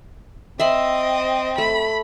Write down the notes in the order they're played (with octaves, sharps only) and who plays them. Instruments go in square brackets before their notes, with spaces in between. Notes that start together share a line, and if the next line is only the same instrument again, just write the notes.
[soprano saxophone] C4 [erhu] D#5 [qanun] E5 B5 C6
[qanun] A3 [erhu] B5